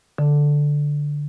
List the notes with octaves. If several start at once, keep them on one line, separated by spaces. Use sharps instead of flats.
D3